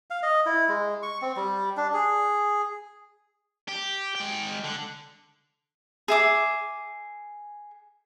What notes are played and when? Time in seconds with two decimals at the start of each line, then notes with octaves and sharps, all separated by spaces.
0.10 F5
0.23 D#5
0.46 E4
0.69 G#3
1.03 C#6
1.22 C4
1.36 G3
1.77 D4
1.94 G#4
3.68 G4
4.15 G#3 G5
4.64 D3
6.08 G#4 E5 D6